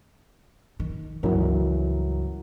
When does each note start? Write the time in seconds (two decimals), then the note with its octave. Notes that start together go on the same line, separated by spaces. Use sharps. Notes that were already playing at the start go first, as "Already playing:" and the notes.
0.80 D#3
1.23 C#2 G2 E3 F#3 A#4